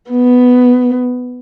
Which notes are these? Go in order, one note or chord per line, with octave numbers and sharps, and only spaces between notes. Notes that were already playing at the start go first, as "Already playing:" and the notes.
B3